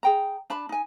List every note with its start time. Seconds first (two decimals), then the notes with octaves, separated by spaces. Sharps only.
0.03 G#4 G5 A#5
0.50 D4 A5 B5
0.69 D#4 G#5